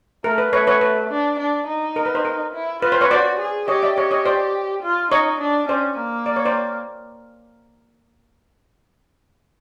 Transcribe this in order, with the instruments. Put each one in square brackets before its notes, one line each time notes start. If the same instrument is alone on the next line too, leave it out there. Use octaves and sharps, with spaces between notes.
[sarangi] A3 [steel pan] A#4
[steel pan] B4
[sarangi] A3 [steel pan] B4 C#5
[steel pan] B4 C#5
B4
[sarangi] D4
D4
D#4
[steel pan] A#4
B4
C5
A#4
[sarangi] E4
[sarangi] F4 [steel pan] B4
[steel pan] C5
B4 C#5
[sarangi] F#4 [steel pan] C5 D5
[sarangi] G#4
[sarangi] G4 [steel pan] C#5 D#5
[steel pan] D5 E5
[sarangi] G4 [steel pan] C#5 D#5
[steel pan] C#5 D#5
C5 D5
[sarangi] F4
[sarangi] D#4 [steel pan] C#5 D#5
[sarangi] D4
[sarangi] C#4 [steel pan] C5 D5
[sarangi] A#3
[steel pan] D5
C#5
C5 D5